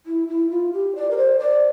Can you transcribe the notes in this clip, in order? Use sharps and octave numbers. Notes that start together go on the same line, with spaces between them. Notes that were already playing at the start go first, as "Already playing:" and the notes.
E4
E4
F4
G4
D5
A#4
C5
D5